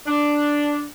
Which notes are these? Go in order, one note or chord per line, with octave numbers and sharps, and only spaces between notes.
D4